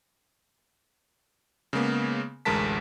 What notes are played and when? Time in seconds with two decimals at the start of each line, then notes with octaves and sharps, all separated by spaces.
1.73 C#3 G#3 A#3 B3
2.45 A1 D2 G#3 A#4 A5 B6